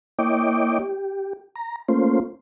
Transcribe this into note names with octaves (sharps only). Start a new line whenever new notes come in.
A#3 E4 C#5 D#5 G5 D6
G4
A#5
A3 A#3 C#4 F4 C5